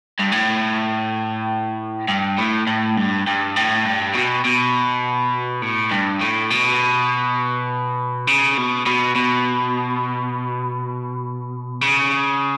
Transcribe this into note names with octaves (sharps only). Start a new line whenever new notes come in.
G2
A2
G2
A2
A2
G2
G2
A2
G2
B2
B2
A2
G2
A2
B2
C#3
B2
B2
B2
C#3